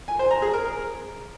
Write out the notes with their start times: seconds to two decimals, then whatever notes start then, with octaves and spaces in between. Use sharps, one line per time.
0.08 G#5
0.19 C5
0.31 A#5
0.42 G#4
0.54 A#4